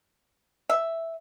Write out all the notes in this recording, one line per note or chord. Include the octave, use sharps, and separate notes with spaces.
E5